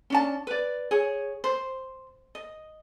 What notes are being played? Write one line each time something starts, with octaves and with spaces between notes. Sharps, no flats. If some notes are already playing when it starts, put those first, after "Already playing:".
C#4 D4 A5
B4 D5
G#4 C#5
C5
D#5